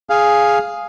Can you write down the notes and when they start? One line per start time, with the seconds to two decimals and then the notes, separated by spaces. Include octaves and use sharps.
0.10 G#4 F5